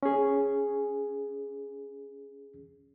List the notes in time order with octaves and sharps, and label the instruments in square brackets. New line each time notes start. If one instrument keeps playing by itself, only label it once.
[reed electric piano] C#4 G#4